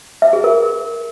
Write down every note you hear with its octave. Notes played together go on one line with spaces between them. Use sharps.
E5
G#4
A#4